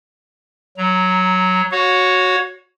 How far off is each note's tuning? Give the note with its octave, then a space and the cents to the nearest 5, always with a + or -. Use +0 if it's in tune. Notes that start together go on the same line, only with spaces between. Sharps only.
F#3 +0 A#5 +0
F#4 +0 C#5 +0 F#5 -40